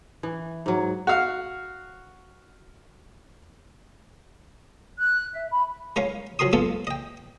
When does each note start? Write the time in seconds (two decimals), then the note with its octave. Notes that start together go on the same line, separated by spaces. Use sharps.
0.23 E3
0.66 G#2 F#3
1.07 F#4 F5
5.00 F#6
5.33 E5
5.51 B5
5.96 G#3 C#4 A#4 F5
6.39 F3 F#3 A#4 C6 D#6
6.53 G#3 A#3 B3 F4 A4
6.87 D#5 G5